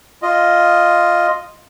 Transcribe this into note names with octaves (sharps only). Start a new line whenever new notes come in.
F4 D#5